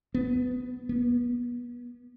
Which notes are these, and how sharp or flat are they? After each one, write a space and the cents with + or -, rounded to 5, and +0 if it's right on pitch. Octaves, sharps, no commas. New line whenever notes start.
B3 +15
B3 -30